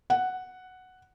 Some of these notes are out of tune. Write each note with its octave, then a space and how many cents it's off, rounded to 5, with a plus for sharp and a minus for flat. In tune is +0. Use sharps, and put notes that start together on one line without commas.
F#5 +0